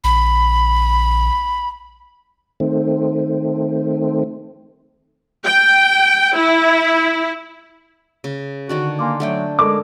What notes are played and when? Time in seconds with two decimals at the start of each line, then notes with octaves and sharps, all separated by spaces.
0.04 A#1 B5
2.60 D#3 A3 C4
5.45 G5
6.35 E4
8.24 C#3
8.69 D3 D#3 D4 F#4
8.99 A#3 G#5 C6 D6
9.20 F#3 A3 D4 E5 F#5 G5
9.59 G#3 A4 A#4 D6